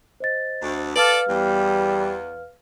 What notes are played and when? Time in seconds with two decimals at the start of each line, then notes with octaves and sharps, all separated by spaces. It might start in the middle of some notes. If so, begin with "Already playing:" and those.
0.20 C5 D#5 A6
0.62 D2
0.96 A4 B4 D5 F5 F6
1.29 E2 G3